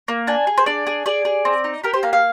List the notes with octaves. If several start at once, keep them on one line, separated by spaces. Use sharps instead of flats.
A#3
D4 G#5
G#4
C5
D4 D5
G#4
G#4 D5
G#4
C4
D#4
G4 A#4
C5
A#3 F5
F5